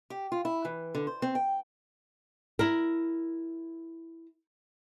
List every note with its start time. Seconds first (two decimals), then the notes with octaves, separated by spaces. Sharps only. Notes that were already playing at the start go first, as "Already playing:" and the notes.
0.10 G4
0.32 F4
0.45 E4
0.65 E3
0.95 D3
1.07 C5
1.22 C4
1.35 G5
2.59 E4 A#4